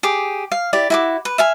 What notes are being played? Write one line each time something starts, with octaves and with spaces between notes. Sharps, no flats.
G4 G#4 D6
F5
E4 G4 D5
E4 F#4 D6
B4
E5 F5 G#5